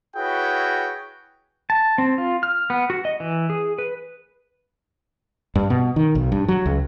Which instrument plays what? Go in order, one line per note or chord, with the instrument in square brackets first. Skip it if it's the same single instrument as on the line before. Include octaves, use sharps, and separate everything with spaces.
[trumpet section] E4 F#4 G#4 B4 C#5 G5
[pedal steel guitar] A5
C4
F4
F6
B3
F#4
D#5
E3
G#4
B4
[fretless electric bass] G2
B2
D#3
B1
G2
F#3
C#2